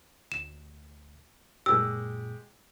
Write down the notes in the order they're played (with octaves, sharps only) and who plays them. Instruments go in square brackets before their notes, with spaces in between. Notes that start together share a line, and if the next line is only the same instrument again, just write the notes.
[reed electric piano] D2 [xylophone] E7
[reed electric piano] F#2 A#2 [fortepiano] G#3 G4 [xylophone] E6